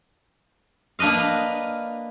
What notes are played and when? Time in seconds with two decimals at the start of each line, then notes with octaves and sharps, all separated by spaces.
0.99 A#3 D4 B4 D#5 F5